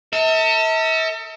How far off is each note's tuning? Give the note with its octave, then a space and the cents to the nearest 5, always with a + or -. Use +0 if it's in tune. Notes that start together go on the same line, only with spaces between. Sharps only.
A4 +40 E5 -40